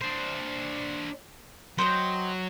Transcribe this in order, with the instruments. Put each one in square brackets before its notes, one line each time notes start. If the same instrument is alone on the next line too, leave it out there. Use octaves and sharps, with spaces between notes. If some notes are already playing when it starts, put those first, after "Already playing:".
[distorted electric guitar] D4 C5
[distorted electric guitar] F#3 [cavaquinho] C5 D#5 G5